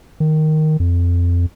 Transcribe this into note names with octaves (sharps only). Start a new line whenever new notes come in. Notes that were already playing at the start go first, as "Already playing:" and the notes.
D#3
F2